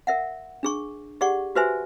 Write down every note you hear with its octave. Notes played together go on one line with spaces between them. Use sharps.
A#4 E5 F#5
D4 G#4 C#6
G4 G#4 D5 F#5 C#6
F#4 G4 B4 C5 E5 G#5